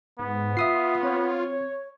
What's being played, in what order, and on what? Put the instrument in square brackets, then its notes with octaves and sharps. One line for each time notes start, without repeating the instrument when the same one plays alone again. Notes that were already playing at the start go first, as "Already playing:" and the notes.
[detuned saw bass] G#2 [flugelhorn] B3
[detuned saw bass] F4 [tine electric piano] E5 D#6 C7
[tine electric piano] C4 [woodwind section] C#5